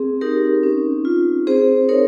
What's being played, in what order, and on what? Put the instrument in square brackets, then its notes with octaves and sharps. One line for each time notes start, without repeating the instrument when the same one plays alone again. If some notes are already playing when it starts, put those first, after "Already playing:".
Already playing: [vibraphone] C4 G#4
D#4 G4 A#4
C#4
F4
C4 G#4 C5
D#4 A#4 C#5